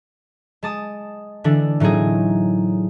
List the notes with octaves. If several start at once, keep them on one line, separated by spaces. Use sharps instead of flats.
G#3 A5 D#6
D3 E3 D4
A2 F#3 C4 D#4 G#4